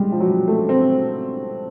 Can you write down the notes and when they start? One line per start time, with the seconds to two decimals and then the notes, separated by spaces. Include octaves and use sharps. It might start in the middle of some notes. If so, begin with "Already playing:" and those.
Already playing: G3 G#3
0.12 F3
0.20 F#3
0.48 A3
0.69 C4